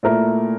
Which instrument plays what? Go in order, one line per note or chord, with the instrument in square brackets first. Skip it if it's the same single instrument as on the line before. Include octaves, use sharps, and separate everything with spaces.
[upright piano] A#2 A3 E4 A#4